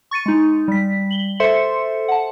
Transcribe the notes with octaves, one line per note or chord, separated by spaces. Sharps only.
C#6 A6 C#7 D#7
G#3 D#4
G3 B6
F#7 G7
A4 C5 E5 C6 C#7
F#5 A5